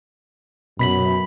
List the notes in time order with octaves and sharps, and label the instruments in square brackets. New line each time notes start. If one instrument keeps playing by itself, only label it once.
[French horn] F#2 [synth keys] B2 [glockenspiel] B5 B6 F#7